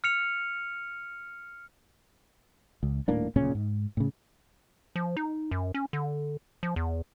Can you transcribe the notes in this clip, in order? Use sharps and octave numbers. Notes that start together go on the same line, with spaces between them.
F6 C#7 F7
C#2
D#1 A2 A#3 D4
D1 A#2 C#3 C#4
G#2
A2 C#3
F3
D#4
F#2
C#4
D3
F3
E2